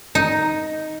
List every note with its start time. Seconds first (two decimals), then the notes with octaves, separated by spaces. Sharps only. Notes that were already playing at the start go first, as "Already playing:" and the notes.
0.15 D#4